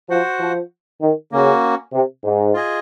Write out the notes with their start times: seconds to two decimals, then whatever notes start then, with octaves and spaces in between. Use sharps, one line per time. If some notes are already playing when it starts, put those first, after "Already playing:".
0.09 F3 F#4 C5 F#5
0.40 F3
1.01 D#3
1.32 C#3 A#3 C#4 F#4
1.93 C3
2.24 G#2
2.54 F4 G#4 D#5 G#5